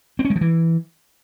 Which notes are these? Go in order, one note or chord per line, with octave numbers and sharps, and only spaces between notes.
C4
C#4
G#3
F3
E3